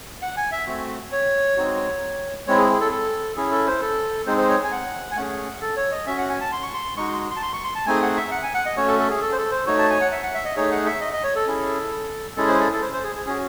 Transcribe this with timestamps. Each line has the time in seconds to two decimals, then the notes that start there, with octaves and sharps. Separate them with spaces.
0.22 F#5
0.37 G#5
0.52 E5
0.67 A3 C4 F#4
1.12 C#5
1.57 G#3 C4 D#4 F#4
2.47 G#3 C4 E4 C#5
2.58 G#4
2.69 G#4
2.81 A4
2.92 A4
3.36 C#4 E4 G#4
3.52 A4
3.67 C5
3.81 A4
4.27 G#3 C4 D#4 G#4 C5
4.38 C5
4.49 C#5
4.64 G#5
4.72 F#5
5.11 G#5
5.16 A3 C#4 G#4 F#5
5.61 A4
5.77 C#5
5.92 D#5
6.06 C#4 F#4 E5
6.18 F#5
6.29 G#5
6.41 A5
6.52 C6
6.63 C#6
6.74 C6
6.97 G#3 D#4 F#4 C#6
7.08 C6
7.31 C6
7.36 A5
7.42 C6
7.53 C#6
7.64 C6
7.75 A5
7.86 A3 C4 D#4 G#4 G#5
8.02 F#5
8.17 E5
8.31 F#5
8.43 G#5
8.54 F#5
8.66 D#5
8.77 A3 C#4 F#4 C#5
8.88 A4
8.99 A4
9.10 G#4
9.21 A4
9.32 C5
9.37 A4
9.51 C5
9.66 A3 D#4 F#4 C#5
9.79 A5
9.90 G#5
10.01 F#5
10.12 E5
10.23 F#5
10.34 E5
10.45 D#5
10.56 A3 D#4 G#4 C#5
10.72 F#5
10.86 E5
11.01 D#5
11.13 D#5
11.24 C#5
11.36 A4
11.47 C#4 E4 G#4
12.37 G#3 C#4 E4 G#4 A4
12.48 C5
12.60 A4
12.73 A4
12.82 C5
12.93 C5
13.04 G#4
13.16 G#4
13.26 C#4 F#4 G#4